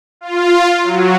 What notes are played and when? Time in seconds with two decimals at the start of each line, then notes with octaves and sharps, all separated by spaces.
0.21 F4
0.83 F#3